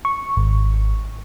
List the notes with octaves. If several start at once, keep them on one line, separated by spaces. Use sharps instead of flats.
C#6
G#1